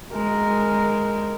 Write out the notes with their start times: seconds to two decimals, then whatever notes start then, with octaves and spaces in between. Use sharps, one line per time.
0.12 G#3 A#4